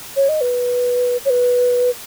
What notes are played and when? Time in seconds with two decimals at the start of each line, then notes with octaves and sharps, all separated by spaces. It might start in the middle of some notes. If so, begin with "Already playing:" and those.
0.16 C#5
0.29 D#5
0.41 B4
1.25 C#5
1.30 B4